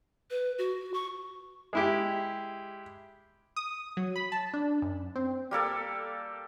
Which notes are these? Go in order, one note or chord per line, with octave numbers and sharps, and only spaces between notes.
B4
F#4
C#6
G#3 E4 G4
D#6
F#3
B5
A5
D4
F#2
C4
G3 A#3 A4 D5